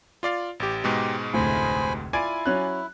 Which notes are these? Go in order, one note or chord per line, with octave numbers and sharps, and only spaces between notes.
F4 D5 F5
A1 G4
G#2 B2 G#3 G4
F1 D2 A2 C5 G#5 B5
E4 F4 D5 G#5 G#6 D7 D#7
F#3 C#4 F#6